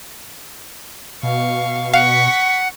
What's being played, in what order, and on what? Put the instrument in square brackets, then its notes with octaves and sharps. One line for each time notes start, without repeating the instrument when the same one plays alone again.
[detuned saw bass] B2 [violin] F5 C#6
[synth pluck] F5 [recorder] F#5 [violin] C#6 B6